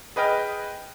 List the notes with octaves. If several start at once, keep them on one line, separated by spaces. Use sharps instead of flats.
G#4 B4 D#5 G5 F6